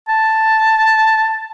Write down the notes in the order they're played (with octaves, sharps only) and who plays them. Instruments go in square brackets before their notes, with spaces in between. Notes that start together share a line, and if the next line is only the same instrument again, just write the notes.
[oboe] A5